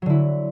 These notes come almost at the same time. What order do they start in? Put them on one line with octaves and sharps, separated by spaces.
F#3 D3 E4